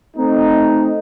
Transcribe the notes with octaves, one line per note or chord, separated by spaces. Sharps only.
A3 C4 D#4